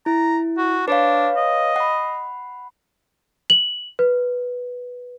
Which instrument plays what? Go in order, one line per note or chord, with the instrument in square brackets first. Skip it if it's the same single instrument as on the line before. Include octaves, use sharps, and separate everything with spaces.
[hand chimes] E4 [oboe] A#5
[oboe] F#4
[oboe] D4 [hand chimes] B4 C#5 F5
[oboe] D#5
[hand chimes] F#5 B5
[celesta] F#7
B4